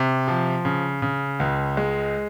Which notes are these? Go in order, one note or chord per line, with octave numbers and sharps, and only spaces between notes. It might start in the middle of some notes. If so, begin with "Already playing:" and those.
Already playing: C3
F3
C#3
C#3
C#2
G#3